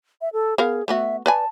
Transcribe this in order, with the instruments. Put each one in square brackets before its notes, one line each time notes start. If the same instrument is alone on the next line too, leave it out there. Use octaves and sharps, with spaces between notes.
[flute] E5
A4
[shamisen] B3 A#4 F5 [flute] G#4
[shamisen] A3 B3 F#4 [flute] E5
[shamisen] B4 D5 G#5 [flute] A5